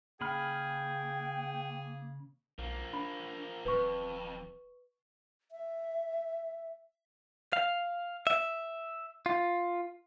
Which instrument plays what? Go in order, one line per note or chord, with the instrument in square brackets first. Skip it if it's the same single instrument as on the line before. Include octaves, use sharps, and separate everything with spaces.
[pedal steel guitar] C#3 B5 F6 [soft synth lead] A#3 [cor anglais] G#4 [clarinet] G5
[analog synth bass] B1 [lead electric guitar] F3 A#3
[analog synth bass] D4 [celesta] B5
[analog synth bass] D#1 [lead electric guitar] F2 [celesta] B4 C#6
[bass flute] E5
[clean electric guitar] F5
E5
F4